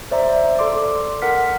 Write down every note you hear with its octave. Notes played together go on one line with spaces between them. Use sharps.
C5 D5 E5 A#5
A4 D5 C6 D6
A#4 F#5 F6 B6